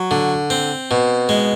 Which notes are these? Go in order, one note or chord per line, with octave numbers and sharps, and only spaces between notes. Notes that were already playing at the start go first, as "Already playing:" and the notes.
Already playing: F#3
D3
C4
B2
G#3